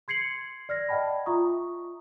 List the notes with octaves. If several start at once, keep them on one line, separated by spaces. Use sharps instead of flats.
C6 G#6 C7 C#7 F#7
D5 F6 G#6 A#6
D5 D#5 F#5 G5 A5 B5
F4 E5 A#5 C#6 D#6